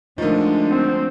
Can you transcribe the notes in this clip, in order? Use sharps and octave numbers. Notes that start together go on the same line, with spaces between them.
D3 F3 G#3 A3 D#4 A#4
C4